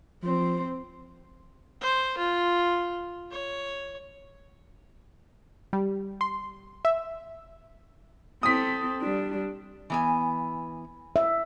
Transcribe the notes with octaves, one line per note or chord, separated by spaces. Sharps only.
F3 C4 C5
C5
F4
C#5
G3
C6
E5
C4 A4 D#6 B6
G3 D4
E3 B3 G#5
E5